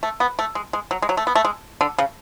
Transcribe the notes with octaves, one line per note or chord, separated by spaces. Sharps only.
A3
B3
A3
G#3
G#3
F#3
G#3
F#3
A3
B3
A3
G#3
D3
C#3